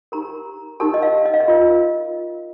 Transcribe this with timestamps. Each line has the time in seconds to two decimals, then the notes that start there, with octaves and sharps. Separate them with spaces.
0.12 D#4 G4 A#4 A#5
0.80 D#4 G4 A#4 A5
0.94 D#5
1.02 F5
1.25 D#5
1.34 F5
1.40 D#5
1.48 F4 A#4